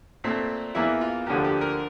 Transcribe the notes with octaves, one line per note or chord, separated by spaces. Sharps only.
A#2 A3 C4
E2 E3 A#3 E4
F4
D2 D3 F3 A#3 G4
G4
A#4